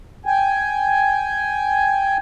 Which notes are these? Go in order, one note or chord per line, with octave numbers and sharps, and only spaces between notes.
G5 G#5